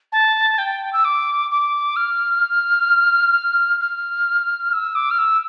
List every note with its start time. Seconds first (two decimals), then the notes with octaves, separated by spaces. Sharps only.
0.12 A5
0.58 G5
0.92 E6
1.04 D6
1.50 D6
1.96 F6
3.80 F6
4.73 E6
4.95 D6
5.10 F6
5.18 E6